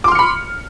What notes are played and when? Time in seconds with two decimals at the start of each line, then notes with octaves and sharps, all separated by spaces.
0.04 D6
0.08 C6
0.12 F6
0.15 C#7
0.19 B5